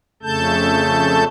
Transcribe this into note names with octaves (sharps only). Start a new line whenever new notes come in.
F2 C#3 A3 A4 A5 G6